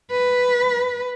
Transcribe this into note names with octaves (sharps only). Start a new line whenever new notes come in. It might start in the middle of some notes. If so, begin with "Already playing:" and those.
B4